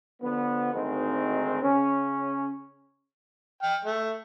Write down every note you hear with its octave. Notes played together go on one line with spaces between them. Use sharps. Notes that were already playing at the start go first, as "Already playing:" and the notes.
D3 F3 B3
G#1 D2 D#3 G#3 C4
C#3 C#4
G5 F6
A3